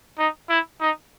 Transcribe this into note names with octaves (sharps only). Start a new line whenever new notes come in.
D#4
E4
D#4